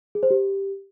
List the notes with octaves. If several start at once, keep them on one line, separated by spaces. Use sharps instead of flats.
G#4
C5
G4